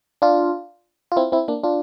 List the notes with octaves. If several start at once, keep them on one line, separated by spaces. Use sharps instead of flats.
D4 F4
F4
C4 E4
C4 E4
A#3 D4
D4 F4